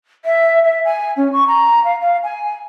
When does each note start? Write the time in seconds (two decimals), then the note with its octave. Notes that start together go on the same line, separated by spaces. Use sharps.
0.25 E5
0.63 E5
0.84 G#5
1.16 C#4
1.32 C#6
1.47 A#5
1.84 F5
2.01 F5
2.23 G#5